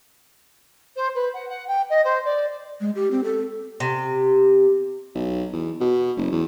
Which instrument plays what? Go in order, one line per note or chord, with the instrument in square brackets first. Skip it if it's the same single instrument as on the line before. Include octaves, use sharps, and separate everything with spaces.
[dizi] C5
B4
F#5
F#5
G5
D#5
C5
D5
[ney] G#3
G4
C4
A4
[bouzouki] C3
[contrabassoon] B1
E2
B2
F#1
E2